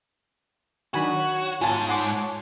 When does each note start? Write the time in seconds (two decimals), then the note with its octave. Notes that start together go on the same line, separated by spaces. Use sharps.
0.94 D#3 F#3 D4 F#4 G#5 B5
1.14 C#5
1.61 G#2 F4 G#5 A5
1.89 F#5 C6 D6